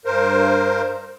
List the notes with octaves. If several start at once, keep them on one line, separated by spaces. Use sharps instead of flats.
G2 A#4 C5